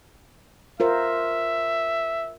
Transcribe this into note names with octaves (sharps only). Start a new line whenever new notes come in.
F4 A#4 C5 E5